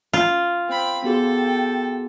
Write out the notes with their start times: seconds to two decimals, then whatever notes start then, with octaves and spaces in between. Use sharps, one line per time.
0.13 F4
0.69 C4 G5 B5
1.04 B3 F#4 G#4 A4